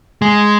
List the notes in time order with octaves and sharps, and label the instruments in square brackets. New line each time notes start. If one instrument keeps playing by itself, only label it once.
[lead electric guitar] G#3